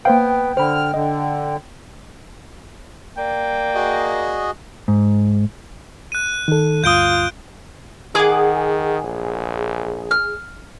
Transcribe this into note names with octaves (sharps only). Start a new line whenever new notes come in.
A#3 B3 C5 F5 G5
D3 C5 B5 F6
D3 D#5
A#3 D5 G5
F#4 G#4 D#5
G#2
F#6 D#7
D#3 A4
D2 G2 F4 D#6 G6 D7 G7
D#3 G#4 F#5 D6
A#1
F6